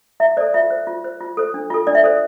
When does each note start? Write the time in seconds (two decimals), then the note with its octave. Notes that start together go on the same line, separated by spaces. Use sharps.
0.20 E4 E5
0.37 C5 D5
0.40 A4
0.54 F4 E5
0.70 C5
0.87 F4
1.04 C5
1.20 F4
1.37 A4 C5
1.54 D4
1.70 F4 A4
1.87 D4 D5
1.95 E5
2.04 A4 C5 D5